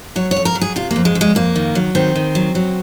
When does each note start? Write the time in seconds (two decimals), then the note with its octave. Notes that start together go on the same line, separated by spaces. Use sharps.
0.16 F#3 C#5
0.31 C#5
0.37 F2
0.45 A#4
0.55 F#3
0.61 G#4
0.76 C3 F4
0.91 A#3
0.96 F2
1.05 G#3
1.15 F2
1.21 G#3
1.35 F2 A#3
1.56 D#3
1.75 F#3
1.95 D#3 C4
2.15 D#3
2.35 F#3
2.55 F#3